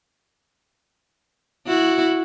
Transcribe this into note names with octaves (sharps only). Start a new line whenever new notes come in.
E4 F#4